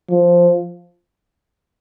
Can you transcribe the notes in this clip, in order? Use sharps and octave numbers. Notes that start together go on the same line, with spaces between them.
F3